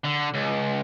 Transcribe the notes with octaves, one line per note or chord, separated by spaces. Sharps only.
D3
C#2